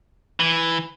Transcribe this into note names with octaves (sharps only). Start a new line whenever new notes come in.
E3